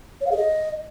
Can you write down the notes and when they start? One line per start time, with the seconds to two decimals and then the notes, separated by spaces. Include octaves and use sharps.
0.21 C#5
0.26 F5
0.31 G#4
0.37 D#5